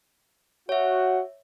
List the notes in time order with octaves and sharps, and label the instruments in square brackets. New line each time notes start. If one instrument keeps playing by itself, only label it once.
[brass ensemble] F#4 F#5 [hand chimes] C#5 E5